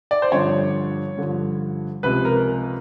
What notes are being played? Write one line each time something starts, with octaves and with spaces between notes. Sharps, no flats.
D5
C5
G2 D3 F3 C#5
G2 D3 F3
C#2 C3 F3 B4
A#4